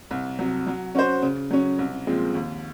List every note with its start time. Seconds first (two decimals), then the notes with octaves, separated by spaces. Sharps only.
0.11 C2
0.39 C3 F#3
0.67 F#3
0.95 C#4 F#4 C5
1.22 C#3
1.51 F#3 C#4
1.79 C2
2.07 A#2 F3 G#3 C4
2.35 D#2